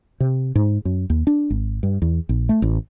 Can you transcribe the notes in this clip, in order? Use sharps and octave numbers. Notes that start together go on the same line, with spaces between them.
C3
G#2
F#2
D#2
D4
G#1
G2
E2
A#1
A3
A1